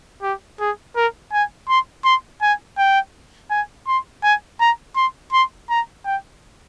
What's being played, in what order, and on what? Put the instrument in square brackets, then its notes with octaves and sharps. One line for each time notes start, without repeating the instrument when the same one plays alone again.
[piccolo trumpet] G4
G#4
A#4
G#5
C6
C6
G#5
G5
G#5
C6
G#5
A#5
C6
C6
A#5
G5